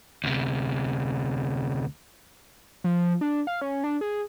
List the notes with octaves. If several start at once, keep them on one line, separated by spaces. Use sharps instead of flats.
D2 C3
F3
D4
F5
C#4
D4
G#4